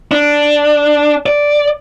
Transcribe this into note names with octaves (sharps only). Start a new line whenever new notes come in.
D4
D5